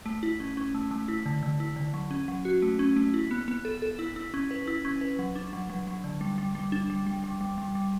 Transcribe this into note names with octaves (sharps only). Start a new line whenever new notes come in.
A3
E4
C#4
C#4
A3
A3
E4
D3
D3
E4
D3
F#3
C#4
F#3
F#4
A3
C#4
A3
E4
B3
B3
A4
A4
E4
E4
C#4
B4
E4
C#4
B4
F#3
D4
F#3
F#3
F#3
D3
G3
G3
G3
D4
G3
G3
G3
G3
G3
G3